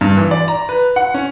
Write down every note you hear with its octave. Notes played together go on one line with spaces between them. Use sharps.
G2
E3
D5
A#5
B4
F#5
C#4